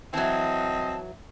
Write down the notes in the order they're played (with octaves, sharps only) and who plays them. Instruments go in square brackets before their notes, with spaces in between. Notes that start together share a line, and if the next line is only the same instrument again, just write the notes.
[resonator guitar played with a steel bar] E3 F#3 [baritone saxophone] C4 [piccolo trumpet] D#5 [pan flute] A5